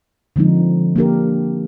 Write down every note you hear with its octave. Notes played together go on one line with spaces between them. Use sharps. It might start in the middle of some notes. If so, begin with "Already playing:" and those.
D3 F3 G#3 C4 D#4
A#3 D4 G4 A#4